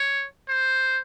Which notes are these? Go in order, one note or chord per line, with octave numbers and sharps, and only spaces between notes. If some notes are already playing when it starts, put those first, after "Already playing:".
Already playing: C#5
C5